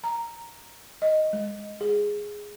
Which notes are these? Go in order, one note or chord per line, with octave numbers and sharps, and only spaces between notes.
A#5
D#5
G#3
G#4